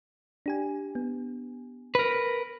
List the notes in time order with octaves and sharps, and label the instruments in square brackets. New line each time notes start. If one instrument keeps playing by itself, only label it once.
[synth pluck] D4 G4 G#5
B3
[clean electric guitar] A#4 B4